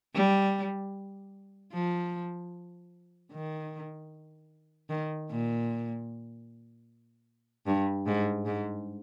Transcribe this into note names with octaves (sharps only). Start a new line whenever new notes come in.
G3
F3
D#3
D#3
A#2
G2
G#2
G#2